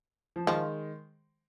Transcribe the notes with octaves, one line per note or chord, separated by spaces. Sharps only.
F3
D#3 F3 G#3